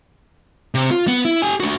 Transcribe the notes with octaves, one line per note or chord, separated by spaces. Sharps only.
C3
F4
B3
E4
G4 G#5
D4 F#4